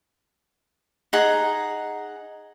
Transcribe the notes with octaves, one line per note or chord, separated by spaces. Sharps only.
D#4 G#4 F#5 A#5